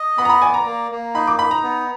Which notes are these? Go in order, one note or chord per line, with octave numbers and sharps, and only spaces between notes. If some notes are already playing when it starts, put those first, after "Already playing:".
Already playing: D#5
B3 B5
A#5
B5
D5 G#5
A#5
A#3
A#3
D#4 B5
D6
D#4 B5
A#5
B3